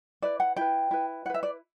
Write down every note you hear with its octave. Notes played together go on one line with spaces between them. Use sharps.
E4 B4 D5
F#5
E4 B4 G5
E4 B4
E4 B4 E5 F#5
D5